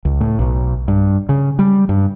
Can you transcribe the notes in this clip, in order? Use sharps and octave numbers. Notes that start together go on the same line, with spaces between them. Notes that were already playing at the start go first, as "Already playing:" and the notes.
C#2
A2
B1
G2
C#3
G3
G2